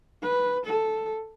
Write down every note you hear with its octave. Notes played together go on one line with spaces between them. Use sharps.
B4
A4